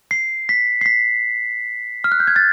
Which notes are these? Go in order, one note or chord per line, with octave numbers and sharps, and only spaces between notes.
C7
B6
C7
B6
F6
F#6
G6
G#6
A6